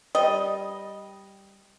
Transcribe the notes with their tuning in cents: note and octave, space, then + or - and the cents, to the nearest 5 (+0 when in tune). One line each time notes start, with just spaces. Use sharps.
G3 +0 D#5 +0